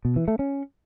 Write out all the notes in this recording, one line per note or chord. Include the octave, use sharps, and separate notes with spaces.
B2
E3
A3
C#4